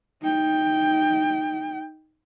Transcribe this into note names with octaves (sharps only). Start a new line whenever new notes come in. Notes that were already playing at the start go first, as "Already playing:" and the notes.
D#4 G5